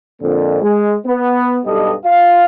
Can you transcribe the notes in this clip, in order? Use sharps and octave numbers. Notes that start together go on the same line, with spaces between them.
F2 A#2 D3
G#3
B3
B1 G2 G3 A4 D#5
F4 F5